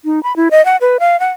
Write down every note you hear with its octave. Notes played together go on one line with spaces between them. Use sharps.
D#4
B5
E4
D#5
F#5
B4
F5
F#5